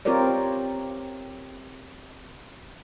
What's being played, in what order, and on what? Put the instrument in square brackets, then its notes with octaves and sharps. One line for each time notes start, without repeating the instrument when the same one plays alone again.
[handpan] C4 F4 G4 A#4 C#5 D5